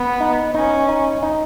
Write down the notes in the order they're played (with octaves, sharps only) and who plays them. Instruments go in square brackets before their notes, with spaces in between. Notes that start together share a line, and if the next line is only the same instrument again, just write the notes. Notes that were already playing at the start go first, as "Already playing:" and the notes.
Already playing: [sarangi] B3
[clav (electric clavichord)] D#4
[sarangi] C#4 [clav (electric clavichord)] D#4
[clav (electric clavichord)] D#4
D#4